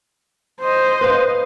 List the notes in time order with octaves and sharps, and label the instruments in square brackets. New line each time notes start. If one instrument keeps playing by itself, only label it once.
[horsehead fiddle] C5 D#5
[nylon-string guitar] B4 F5